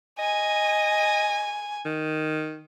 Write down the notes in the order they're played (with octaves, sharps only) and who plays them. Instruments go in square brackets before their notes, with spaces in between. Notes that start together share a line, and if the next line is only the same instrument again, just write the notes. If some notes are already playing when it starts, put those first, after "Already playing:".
[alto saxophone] D#5 [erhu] G#5
[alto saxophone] D#3